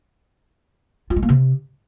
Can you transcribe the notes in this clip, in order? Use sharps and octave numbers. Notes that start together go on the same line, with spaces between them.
F4
G#3
A#3
C3